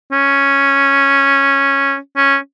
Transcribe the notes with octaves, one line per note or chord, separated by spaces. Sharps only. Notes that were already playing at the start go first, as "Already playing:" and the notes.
C#4
C#4